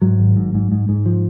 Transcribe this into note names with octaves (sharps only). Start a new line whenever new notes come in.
G#2 F#3
G#1
G#2
G#2
G#2
G#2
F3